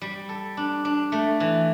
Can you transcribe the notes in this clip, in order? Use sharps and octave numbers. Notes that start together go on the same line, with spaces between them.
G3
A4
D4
D4
A3
E3